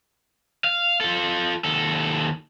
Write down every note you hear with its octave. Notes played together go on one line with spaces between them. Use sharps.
F5
F4 A4
D#2 A4